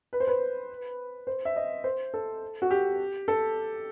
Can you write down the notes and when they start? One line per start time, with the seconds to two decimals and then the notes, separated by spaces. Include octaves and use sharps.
0.13 B4
0.20 C5
0.27 B4
1.27 C5
1.45 E5
1.56 D#5
1.84 C5
2.14 A4
2.62 F#4
2.71 G4
3.28 A4